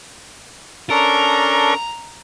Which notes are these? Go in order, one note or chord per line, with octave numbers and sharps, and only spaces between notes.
C#4 D4 A4 A#4 A#5